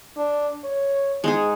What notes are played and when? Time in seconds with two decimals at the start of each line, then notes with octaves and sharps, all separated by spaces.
0.17 D4
0.64 C#5
1.24 G#2 G#3 D#4 G#4